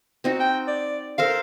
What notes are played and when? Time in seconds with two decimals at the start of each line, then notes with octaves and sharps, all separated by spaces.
0.24 C4 D#4 F#4
0.40 G5
0.67 D5
1.18 A4 A#4 C5 F5